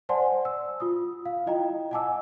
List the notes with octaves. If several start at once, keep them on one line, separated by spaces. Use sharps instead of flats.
C5 D5 F#5 G#5 A5 C6
E6
F4 D#6
F5
E4 F4 D#5 G5 A#5
D#5 F#5 G#5 A5 D6 E6